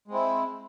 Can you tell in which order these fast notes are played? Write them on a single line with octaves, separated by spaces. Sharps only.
G#3 C4 E4